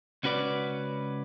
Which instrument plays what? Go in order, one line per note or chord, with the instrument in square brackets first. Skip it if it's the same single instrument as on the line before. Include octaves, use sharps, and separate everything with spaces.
[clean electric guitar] C#2 C#4 F#4 B4 D5